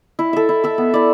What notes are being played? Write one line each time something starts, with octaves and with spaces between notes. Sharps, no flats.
E4
A4 E5
E4
A4 E5
B3
E4 D5